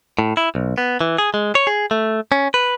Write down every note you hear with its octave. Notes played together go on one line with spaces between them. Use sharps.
A2
E4
B1
B3
E3
G#4
G#3
C#5
G#4
A3
C#4
B4